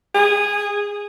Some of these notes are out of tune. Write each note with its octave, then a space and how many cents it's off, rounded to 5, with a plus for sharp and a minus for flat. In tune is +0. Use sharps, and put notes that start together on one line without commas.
G#4 -15